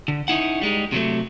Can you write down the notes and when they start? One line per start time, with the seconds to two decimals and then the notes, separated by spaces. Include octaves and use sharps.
0.08 D3
0.28 C#4 D#4 E4 F#5
0.61 G3 G#3 D#4
0.92 C3 F#3 A3